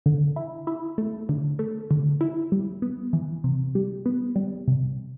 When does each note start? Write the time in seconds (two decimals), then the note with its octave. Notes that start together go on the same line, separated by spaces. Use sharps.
0.06 D3
0.36 E4
0.67 E4
0.98 A3
1.29 D3
1.59 A3
1.91 D3
2.21 E4
2.52 G3
2.82 B3
3.13 E3
3.44 C3
3.75 G3
4.06 B3
4.36 G3
4.68 C3